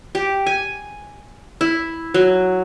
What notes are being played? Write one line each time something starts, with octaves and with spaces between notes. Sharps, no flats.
G4
G#5
E4
F#3